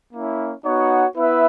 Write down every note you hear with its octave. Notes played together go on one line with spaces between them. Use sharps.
A#3 C#4 E4
B3 D#4 F#4 C#5 F#5
B3 E4 B4 E5